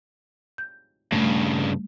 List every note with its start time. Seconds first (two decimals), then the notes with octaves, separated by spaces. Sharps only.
0.58 G6
1.12 G2 C#3 G3 A3